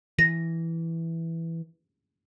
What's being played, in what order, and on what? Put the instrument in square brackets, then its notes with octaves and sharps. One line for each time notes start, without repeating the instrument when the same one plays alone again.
[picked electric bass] E3 [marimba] A#6